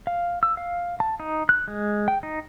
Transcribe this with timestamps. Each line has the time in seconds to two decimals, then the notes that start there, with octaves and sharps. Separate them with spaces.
0.07 F5
0.43 E6
0.57 F5
1.00 A5
1.20 D#4
1.49 F#6
1.68 G#3
2.08 G5
2.23 D#4